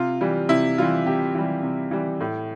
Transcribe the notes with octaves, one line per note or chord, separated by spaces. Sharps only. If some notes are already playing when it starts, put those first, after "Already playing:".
Already playing: C3 F4
E3 G3
C3 E4
E3 G3 F4
C3 G4
E3 G3
C3
E3 G3
A2